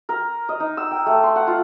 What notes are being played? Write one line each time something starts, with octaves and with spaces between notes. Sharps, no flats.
A#4
D#5
D#4
E6
G5
A3
C6
F#5
F4